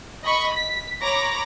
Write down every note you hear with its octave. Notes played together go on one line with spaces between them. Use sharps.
D#5 B5 C#6
B6
C#5 A#5 B5 D6 A#6